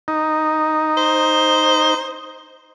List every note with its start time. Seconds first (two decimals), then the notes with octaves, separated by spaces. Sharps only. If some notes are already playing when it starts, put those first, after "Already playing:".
0.08 D#4
0.97 C5